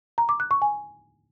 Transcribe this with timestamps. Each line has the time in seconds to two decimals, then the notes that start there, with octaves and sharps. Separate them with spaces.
0.18 A#5
0.29 D6
0.40 F#6
0.51 C#6
0.62 G#5